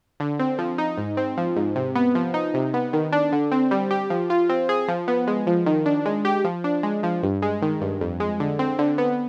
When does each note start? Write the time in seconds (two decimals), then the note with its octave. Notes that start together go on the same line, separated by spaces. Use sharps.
0.20 D3
0.39 C4
0.59 F3
0.78 D#4
0.98 G#2
1.17 C4
1.37 F3
1.56 G#2
1.76 C3
1.95 B3
2.15 F3
2.34 D#4
2.54 C3
2.74 B3
2.93 D#3
3.12 D4
3.32 D3
3.52 C4
3.71 G3
3.91 G4
4.10 F3
4.30 F4
4.49 C4
4.69 G#4
4.88 F3
5.08 B3
5.27 G#3
5.47 F3
5.66 D#3
5.86 D4
6.06 G#3
6.25 G4
6.44 F3
6.64 D4
6.83 G#3
7.03 F3
7.23 G2
7.42 G#3
7.62 D#3
7.81 G2
8.01 F2
8.20 G#3
8.40 D3
8.59 C4
8.79 D3
8.98 B3